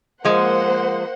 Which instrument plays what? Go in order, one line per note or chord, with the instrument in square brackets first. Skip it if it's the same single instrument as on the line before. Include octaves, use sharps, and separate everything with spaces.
[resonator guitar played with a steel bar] F3 G#3 [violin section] A#3 C5 F#5